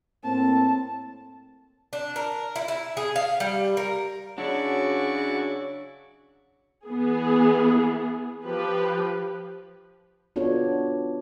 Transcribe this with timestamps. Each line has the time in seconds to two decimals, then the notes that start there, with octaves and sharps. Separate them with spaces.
0.24 A2 A#3 C4 A5
1.93 D4
2.16 A#4
2.56 E4
2.68 E4
2.97 G#4
3.16 F5
3.40 G3
3.77 A#4
4.38 C#3 F#3 D4 E4 F#4 D5 C#6
6.86 E3 B3 G#4
8.43 F3 G4 B4
10.36 B3 D4 F4 F#4 A4 C#5